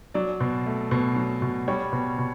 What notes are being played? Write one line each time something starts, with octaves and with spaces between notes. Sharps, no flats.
F#3 D5
B2
A3
B2
F#3
B2
G3 C#5
B2
B2